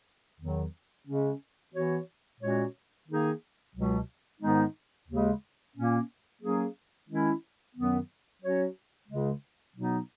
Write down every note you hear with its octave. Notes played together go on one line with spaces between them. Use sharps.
E2 D#3 F#3
C#3 G#3 C#4
E3 B3 F#4 C#5
A#2 G#3 C#4 F#4 C#5
D#3 A#3 D#4 G#4
C#2 B2 F#3
G#2 D#3 G#3 B3 D#4
D#2 C#3 G#3
A#2 A#3 C#4
F#3 A#3 C#4 G#4
D#3 G#3 C#4 E4
F#2 D#3 F#3 B3
F#3 C#4 F#4 C#5
C#2 C#3 G#3
B2 F#3 B3 D#4